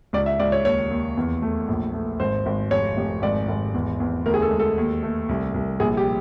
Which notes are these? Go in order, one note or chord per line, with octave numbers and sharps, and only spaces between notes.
C#2 D5
E5
C#2 D5
C#5
D#2 C#5
D#2
E2
A3
A#1
A3
G#1 C5
G#1
F1 C#5
F1
G#1 D5
G#1
E2
E2
D2 A#4
G#4
A4
G#3
A4
D#2
A3
C2
C2
A#1 G#4
G4